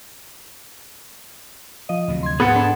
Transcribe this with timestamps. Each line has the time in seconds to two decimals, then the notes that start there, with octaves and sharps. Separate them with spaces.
1.89 F3 D#5
2.08 D2 C3 F#3
2.23 C6 G#6
2.40 G#2 B3 G#4 A4 F#5
2.56 D4 A5